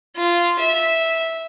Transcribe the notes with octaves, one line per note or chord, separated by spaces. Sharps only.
F4
E5